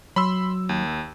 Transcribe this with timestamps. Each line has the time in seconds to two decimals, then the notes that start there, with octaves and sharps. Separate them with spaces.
0.16 F#3 B5 C6 E6
0.69 D#2